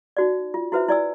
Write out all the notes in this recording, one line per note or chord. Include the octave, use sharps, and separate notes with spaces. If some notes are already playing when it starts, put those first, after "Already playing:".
D#4 F#4 D5
F4
E4 F#4 B4 C5 E5
E4 D5 G#5 E6